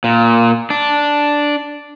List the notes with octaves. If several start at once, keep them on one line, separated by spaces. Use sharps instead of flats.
A#2
D4